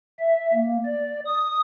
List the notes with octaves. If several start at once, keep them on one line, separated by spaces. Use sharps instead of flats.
E5
A#3
D5
D#6